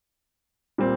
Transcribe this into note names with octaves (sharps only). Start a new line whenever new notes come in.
A#2 G3 C4